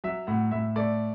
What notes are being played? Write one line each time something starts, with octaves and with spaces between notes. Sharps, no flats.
F#3 E5
A2 F#5
A2 E5
A3 D5